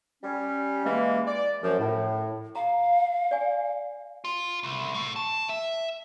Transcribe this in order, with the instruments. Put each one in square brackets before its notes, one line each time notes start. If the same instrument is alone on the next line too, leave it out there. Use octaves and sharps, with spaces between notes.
[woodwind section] G3 C#4
E3 G#3 A#3
D5
F#2 F3
A2
[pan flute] F5 [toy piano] A#5
[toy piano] D5 G#5
[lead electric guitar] F4
C2
A2
A5
E5